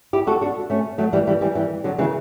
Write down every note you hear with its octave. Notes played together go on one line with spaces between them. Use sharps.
E4 G4
F#4 A4
D4 F#4
A3 C#4
F#3 A3
E3 G3
E3 G3
E3 G3
E3 G3
D3 F#3
C#3 E3